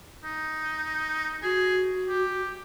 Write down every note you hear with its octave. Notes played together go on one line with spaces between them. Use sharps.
D#4
F#4 G#4
G4